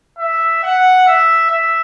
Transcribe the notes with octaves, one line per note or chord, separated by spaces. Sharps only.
E5
F#5
E5
E5